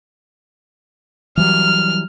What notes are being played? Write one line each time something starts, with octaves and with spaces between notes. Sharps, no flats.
E3 F#3 G3 F6